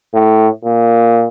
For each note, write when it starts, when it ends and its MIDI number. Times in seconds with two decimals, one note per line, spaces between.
0.14 0.48 45
0.65 1.28 46